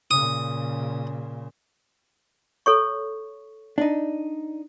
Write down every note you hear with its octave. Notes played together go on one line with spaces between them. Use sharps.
A#2 C#3 D#6
A4 C#5 C#6
D4 D#4